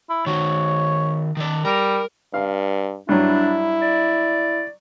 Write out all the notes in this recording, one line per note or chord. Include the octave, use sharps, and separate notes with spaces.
E4
D#3 F#4 C#5
D#3 D5
G3 A#4
G2 F5
G2 F#3 D4 E4
D5